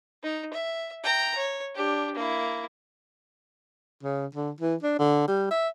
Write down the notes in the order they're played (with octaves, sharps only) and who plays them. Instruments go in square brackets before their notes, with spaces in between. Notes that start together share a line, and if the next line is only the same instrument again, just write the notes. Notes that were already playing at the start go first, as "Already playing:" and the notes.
[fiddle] D#4
E5
G5 A#5
C#5
D4 G4
A#3 E4
[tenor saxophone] C#3
D3
E3
D4
D3
G3
E5